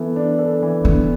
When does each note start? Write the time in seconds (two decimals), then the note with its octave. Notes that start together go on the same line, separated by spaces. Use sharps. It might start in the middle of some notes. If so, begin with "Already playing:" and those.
Already playing: E3 B3 A4
0.16 D4
0.39 A4
0.62 E3
0.84 D3 B3